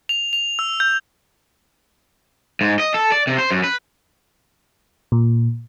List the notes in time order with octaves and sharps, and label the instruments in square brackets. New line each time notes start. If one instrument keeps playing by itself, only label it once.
[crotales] F7
F7
E6
G6
[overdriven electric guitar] G#2
D#5
A4
D5
C3
C5
F#2
B4
[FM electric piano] A#2